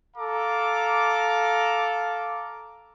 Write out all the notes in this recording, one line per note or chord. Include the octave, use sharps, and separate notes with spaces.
A4 F5 A#5 D6